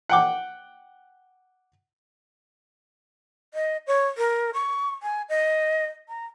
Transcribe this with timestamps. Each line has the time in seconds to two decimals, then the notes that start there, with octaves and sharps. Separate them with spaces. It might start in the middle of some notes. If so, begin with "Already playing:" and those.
0.09 F#5 G5 D6
3.54 D#5
3.87 C#5
4.18 A#4
4.54 C#6
5.03 G#5
5.29 D#5
6.09 A#5